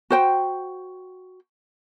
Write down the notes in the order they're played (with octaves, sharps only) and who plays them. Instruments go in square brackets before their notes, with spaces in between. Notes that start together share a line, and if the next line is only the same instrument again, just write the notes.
[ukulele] F#4 C5 G5